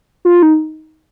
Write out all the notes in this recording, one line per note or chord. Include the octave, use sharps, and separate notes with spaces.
F4
D#4